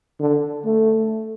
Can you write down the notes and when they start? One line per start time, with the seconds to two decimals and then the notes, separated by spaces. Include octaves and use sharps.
0.20 D3
0.65 A3